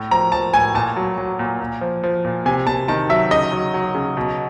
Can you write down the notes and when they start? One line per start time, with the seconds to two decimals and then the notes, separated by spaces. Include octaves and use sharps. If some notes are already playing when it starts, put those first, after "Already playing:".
Already playing: A2
0.11 F3 A#5
0.32 F3 A5
0.53 A2 G#5
0.75 A#2 A5
0.96 F#3
1.18 F#3
1.39 A#2
1.61 A#2
1.81 F3
2.03 F3
2.25 A#2
2.46 C3 G#5
2.67 C3 A5
2.88 D#3 A5
3.09 F#3 E5
3.31 C#3 D#5
3.52 F#3
3.74 F#3
3.95 C#3
4.17 B2